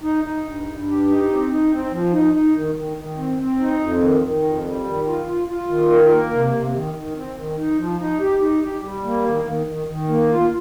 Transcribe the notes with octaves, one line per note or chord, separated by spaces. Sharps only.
D#4
D#4
G2
G2
G4
D#4
C4
D#4
C4
F3
D#4
D#4
D#3
D#3
D#3
C4
C4
D#4
F2
D#3
D#3
F2
G3
D#3
F4
F4
F4
D#3
A#4
A#3
C3
C3
D#3
D#3
C4
D#3
D#4
F3
D#4
G4
D#4
G4
G3
A#3
D#3
D#3
D#3
D#3
A#3
F4